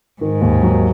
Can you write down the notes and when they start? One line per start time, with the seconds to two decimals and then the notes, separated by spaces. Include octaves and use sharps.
0.21 G#2 D#3
0.41 D#2
0.62 F#3